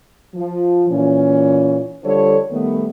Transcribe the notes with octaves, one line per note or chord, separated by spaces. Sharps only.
F3
A#2 E3 C#4
D3 F3 G3 A4 C5 C#5
D#3 G3 A3 B3